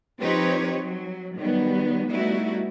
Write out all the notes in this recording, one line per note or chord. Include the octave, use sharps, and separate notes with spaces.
F3 C4 D#4 G4 B4 C#5
F#3
D#3 F#3 G3 B3
G3 A3 B3 D#4 E4 F#4